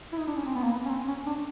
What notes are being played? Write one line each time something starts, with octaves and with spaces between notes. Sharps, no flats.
E4
D#4
D4
C#4
C4
B3
A#3
B3
C#4
C4
C#4
D4